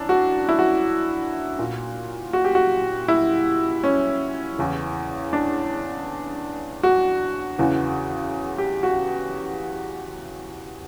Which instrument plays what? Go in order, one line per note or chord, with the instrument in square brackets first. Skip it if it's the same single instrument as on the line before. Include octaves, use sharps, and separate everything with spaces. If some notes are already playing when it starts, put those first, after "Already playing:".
Already playing: [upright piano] F#2 D4 E4
F#4
E4
F#4
A#2
F#4
G4
F#4
E4
C#4
E2 C#3 E3
D4
F#4
E2 C#3 E3
G4
F#4